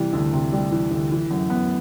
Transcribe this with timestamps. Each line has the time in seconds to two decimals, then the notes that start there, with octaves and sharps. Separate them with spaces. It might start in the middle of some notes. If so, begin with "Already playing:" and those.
Already playing: C3 E3 G3
0.13 D2
0.33 C3
0.53 G3
0.72 E3
0.91 D2
1.12 E3
1.31 F#2
1.50 B3